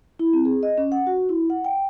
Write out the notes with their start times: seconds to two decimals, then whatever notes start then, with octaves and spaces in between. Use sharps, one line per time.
0.19 E4
0.33 C4
0.45 G#4
0.63 D#5
0.78 C#4
0.92 F#5
1.07 F#4
1.29 E4
1.50 F#5
1.65 G5